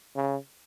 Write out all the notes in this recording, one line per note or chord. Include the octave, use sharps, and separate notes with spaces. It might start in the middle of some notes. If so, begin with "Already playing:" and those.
C#3